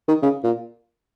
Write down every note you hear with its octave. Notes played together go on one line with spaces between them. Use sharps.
D#3
C#3
A#2